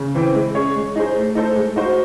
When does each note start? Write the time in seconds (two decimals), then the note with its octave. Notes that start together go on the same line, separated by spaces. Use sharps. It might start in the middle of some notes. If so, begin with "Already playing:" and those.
Already playing: C#3
0.15 E3 C4
0.34 G#3
0.55 C#4 G#4 C#5
0.76 G#3
0.96 D#4 G#4 C5
1.16 A3
1.35 D#4 A4 C5
1.56 G#3
1.76 D#4 F#4 C5